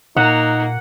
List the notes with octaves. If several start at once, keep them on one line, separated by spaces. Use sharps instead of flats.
A#2 A#3 D#4 F#5